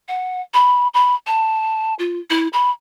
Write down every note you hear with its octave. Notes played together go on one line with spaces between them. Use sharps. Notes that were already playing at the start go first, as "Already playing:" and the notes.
F#5
B5
B5
A5
F4
E4
B5